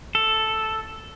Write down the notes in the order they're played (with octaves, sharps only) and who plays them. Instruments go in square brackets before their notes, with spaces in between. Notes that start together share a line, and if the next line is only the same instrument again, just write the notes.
[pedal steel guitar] A4